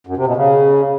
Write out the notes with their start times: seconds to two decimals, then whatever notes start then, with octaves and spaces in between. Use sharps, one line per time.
0.07 F#2
0.17 C3
0.27 B2
0.36 C#3